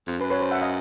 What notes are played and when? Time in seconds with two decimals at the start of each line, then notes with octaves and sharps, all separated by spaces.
0.07 F2
0.20 F#2 B4
0.30 B4 C#5
0.41 C5
0.51 E5 F#5
0.62 D#5 F5